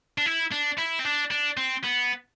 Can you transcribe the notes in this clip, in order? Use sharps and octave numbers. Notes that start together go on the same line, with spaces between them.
D4
E4
D4
E4
C4
D4
D4
C4
B3